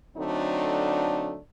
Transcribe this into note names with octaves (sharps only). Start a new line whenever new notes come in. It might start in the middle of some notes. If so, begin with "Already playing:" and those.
D3 F#3 A3 C4 D4 D#4